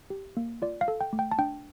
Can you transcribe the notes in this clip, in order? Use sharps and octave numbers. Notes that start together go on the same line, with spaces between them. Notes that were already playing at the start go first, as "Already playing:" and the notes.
G4
A#3
F4 D5
F5
A4
G5
A3
G5
A5
D4 G5